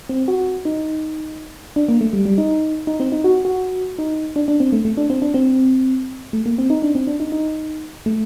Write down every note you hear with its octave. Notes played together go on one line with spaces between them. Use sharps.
C4
F#4
D#4
D4
A#3
A3
G3
G3
D#4
D#4
C4
D#4
F#4
F#4
D#4
D4
D4
C4
A3
A3
D4
C4
D4
C4
A3
A#3
C4
D#4
D4
C4
D4
D#4
D#4
A3